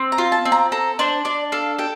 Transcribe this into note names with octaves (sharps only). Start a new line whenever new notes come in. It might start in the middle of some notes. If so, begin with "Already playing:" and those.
Already playing: C4
A#5
F4
A5
C4
A#5
A4 A#5
D4 C5
D4 D5
A4 F5
A4 G5